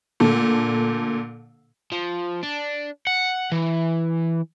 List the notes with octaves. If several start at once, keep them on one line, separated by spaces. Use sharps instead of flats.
A#2 D3 A3 A4
F3
D4
F#5
E3